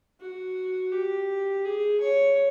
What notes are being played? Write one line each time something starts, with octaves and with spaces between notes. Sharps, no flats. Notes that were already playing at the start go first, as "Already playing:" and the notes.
F#4
G4
G#4
C#5